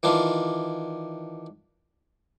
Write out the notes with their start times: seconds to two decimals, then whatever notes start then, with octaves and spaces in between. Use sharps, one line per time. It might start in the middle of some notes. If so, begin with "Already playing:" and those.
0.03 D#3 E3 D4 F4